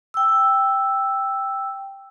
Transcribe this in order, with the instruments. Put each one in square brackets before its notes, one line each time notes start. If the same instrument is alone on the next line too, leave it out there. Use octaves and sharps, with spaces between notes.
[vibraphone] G5 E6